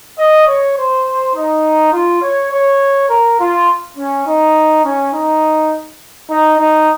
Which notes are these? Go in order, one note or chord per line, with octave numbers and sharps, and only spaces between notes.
D#5
C#5
C5
D#4
F4
C#5
C#5
A#4
F4
C#4
D#4
C#4
D#4
D#4
D#4